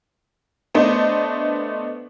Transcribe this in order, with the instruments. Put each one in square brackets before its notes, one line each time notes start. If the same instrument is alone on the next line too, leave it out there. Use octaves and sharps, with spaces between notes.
[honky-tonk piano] A3 B3 D4 C5 D#5